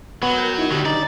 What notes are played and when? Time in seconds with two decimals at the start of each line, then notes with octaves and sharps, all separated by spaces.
0.23 F#3 B3
0.37 A#4 G5 G6
0.58 D#4 E4
0.71 A2 D3 F#3 G4
0.86 D#4 D5